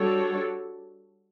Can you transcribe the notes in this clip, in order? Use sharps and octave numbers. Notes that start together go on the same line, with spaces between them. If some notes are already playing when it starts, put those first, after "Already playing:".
Already playing: G3 D4 F#4 A4 C#5